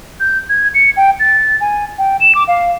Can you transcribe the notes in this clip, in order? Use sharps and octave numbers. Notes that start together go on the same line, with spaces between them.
G6
G#6
C#7
G5
A6
G#5
G5
E7
D6
F5